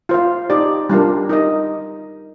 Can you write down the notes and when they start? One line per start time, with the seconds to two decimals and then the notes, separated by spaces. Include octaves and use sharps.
0.09 F4 C5 F5
0.50 D#4 G4 D5
0.90 G3 D4 F4 A#4
1.29 D#4 A#4 D#5